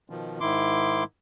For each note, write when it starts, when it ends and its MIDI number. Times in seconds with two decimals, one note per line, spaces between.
0.10 0.39 47
0.10 0.39 51
0.10 0.39 53
0.41 1.04 44
0.41 1.04 51
0.41 1.04 64
0.41 1.04 84
0.41 1.04 86